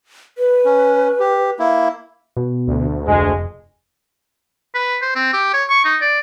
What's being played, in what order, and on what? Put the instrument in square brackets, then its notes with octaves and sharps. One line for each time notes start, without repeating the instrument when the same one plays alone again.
[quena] B4
[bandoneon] C#4
G4
A#3 E4
[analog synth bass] B2
[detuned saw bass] D2
[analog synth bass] F1 [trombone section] G#3
[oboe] B4
C5
C4
G4
C#5
C#6
D#4
D5